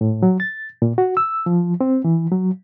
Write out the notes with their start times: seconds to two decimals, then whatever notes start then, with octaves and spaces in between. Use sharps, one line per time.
0.01 A2
0.23 F#3
0.40 A6
0.82 A#2
0.98 F#4
1.17 E6
1.46 F3
1.81 C4
2.04 E3
2.32 F#3